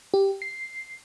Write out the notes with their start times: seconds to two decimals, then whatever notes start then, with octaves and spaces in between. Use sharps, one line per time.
0.14 G4
0.42 C7